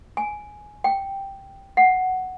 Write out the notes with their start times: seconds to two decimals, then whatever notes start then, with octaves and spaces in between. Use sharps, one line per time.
0.17 G#5
0.84 G5
1.77 F#5